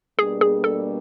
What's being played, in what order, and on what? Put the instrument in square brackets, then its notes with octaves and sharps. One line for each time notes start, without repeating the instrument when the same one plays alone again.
[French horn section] B2 G3 A#3 D4 [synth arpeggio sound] G#4
[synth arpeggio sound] G#4
A4